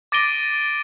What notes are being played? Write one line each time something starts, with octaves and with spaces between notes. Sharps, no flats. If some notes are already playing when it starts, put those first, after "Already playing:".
D6 A6 A#6 D7 D#7 G7